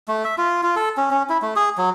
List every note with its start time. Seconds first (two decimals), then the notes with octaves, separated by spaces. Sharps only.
0.08 A3
0.24 E5
0.38 F4
0.63 F4
0.76 A4
0.97 C#4
1.11 C#4
1.29 E4
1.42 A3
1.56 G#4
1.78 F#3